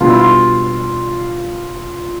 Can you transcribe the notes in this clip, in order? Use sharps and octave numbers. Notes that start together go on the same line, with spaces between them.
B2 G3 D4 F4
E4
F4